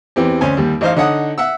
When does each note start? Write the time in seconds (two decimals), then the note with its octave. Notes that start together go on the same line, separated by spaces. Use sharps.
0.16 E2 E3 C4 G4
0.41 D2 C#4 C5 G#5
0.57 D#2 G3
0.81 A1 D#4 C5 F5
0.96 D3 D#4 C#5 F#5 D#6
1.38 E5 F#5 E6